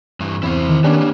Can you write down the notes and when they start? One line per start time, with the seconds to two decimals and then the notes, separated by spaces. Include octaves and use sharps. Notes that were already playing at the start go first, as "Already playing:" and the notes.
0.20 G2 E3
0.43 E2 C4 E4 C5 B5
0.69 D#3
0.84 A#3 B3 C#4 D4 G4